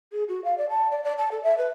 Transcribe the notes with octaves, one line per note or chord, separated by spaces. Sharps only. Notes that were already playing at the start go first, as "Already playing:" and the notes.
G#4
F#4
F5
D5
A5
D5
D5
A5
A4
E5
B4